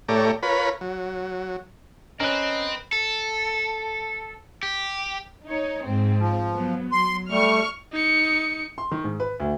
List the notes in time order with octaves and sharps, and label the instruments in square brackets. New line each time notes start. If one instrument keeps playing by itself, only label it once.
[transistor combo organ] A2 A3 G4 C#5 D5 A#5
F4 A#4 B4 C#5 B5
F#3
[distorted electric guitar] C4 [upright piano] C#4 F#7 [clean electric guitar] A#4 B4 [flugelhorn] D#5
[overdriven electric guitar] A4
G4
[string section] D#4 C#5
G#2 C4
[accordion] F3
[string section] F#3 B3
[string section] F#3 [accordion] C6
[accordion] G3 A3 [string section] C#6 F6
[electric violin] D#4 C#7
[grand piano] C6
D#3
G#2
B4
D2